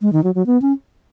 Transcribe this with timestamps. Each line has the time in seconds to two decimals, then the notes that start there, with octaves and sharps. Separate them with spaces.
0.02 G#3
0.13 D#3
0.24 F#3
0.35 F#3
0.46 B3
0.62 C#4